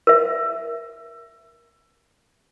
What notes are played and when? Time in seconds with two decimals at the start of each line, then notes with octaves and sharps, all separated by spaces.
0.07 A#4 E5